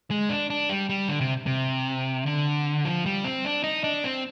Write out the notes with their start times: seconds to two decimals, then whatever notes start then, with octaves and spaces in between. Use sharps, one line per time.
0.11 G#3
0.29 D4
0.50 D4
0.69 G3
0.89 G3
1.08 D3
1.21 C3
1.46 C3
2.26 D3
2.85 F3
3.06 G3
3.24 C4
3.45 D4
3.64 D#4
3.84 D4
4.04 C4